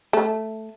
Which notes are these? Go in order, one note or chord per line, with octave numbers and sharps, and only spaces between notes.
A3